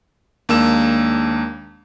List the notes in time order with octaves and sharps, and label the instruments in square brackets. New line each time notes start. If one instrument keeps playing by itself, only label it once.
[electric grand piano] D#2 G#3 A#3 D4 E6 E7